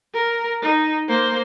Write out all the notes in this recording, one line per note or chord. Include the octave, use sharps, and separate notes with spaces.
A#4
D#4
A#3 C5